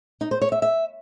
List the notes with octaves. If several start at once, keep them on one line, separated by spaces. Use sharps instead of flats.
D#4
C5
C#5
E5
E5